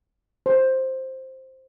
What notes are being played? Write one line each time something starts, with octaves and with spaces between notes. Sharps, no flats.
C5